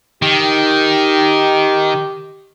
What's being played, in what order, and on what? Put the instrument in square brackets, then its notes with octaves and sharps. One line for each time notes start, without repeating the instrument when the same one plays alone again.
[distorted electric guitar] D#3 [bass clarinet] G4